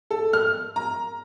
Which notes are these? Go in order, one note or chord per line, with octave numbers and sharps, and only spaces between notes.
A4
F6
A#5